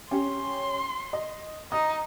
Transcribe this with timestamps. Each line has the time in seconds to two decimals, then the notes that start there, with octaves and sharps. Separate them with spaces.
0.11 C#4 G4 C#5 C6
1.13 D#5
1.72 D#4 D#6